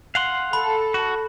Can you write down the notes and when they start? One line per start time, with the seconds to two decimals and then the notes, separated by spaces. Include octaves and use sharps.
0.15 F5 F#5 C6
0.53 A4 B5
0.94 F#4